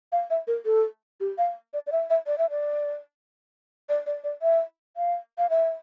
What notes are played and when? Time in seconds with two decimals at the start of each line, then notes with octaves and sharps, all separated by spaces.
0.12 F5
0.30 E5
0.47 A#4
0.65 A4
1.20 G4
1.38 F5
1.74 D5
1.87 D5
1.92 E5
2.10 E5
2.27 D5
2.38 E5
2.50 D5
3.89 D5
4.06 D5
4.24 D5
4.42 E5
4.97 F5
5.38 F5
5.50 E5